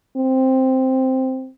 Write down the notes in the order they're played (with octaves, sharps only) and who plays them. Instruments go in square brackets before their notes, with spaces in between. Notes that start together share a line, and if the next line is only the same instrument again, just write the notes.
[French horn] C4